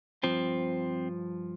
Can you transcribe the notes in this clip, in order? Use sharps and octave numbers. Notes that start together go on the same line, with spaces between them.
G2 F3 C4